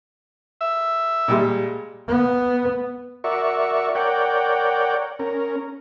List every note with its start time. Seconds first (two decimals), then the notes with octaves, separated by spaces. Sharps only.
0.61 E5
1.28 A#2 G3 G#3
2.08 B3
3.24 F#4 A#4 D5 E5 C#6
3.95 A#4 C#5 D5 F#5 G5
5.19 C#4 A#4